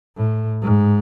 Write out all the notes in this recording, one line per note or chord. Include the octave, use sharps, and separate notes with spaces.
A2
G#2